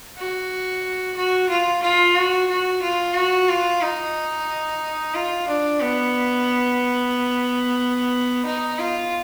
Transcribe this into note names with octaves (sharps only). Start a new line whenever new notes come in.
F#4
F#4
F4
F4
F#4
F#4
F4
F#4
F4
D#4
F4
D4
B3
D#4
F4